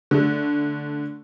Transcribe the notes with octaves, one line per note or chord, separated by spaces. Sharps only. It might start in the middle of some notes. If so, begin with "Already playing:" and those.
D3 A3